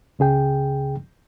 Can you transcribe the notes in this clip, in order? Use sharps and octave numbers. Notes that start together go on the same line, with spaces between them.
C#2 C#3 G#4 G5